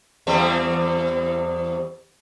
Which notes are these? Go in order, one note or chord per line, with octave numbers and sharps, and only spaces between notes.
E2 G3 C4